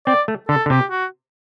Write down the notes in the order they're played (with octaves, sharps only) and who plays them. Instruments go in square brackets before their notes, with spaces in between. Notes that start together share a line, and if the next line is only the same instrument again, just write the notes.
[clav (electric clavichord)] C4 [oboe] D5
[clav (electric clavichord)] A3
[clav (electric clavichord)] D3 [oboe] A4
[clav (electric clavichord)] D3
[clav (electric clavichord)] C3 [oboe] G4
[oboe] F#4